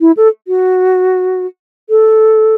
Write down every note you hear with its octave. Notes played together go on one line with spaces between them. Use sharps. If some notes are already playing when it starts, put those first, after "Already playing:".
E4
A4
F#4
A4